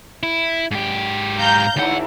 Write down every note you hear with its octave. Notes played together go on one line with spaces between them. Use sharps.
E4
G#2 G4
F5 A#5 G6
G#1 D2 E4 F#5